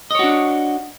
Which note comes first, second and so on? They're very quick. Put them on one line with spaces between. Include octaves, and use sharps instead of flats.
D#5 C#5 F#4 D4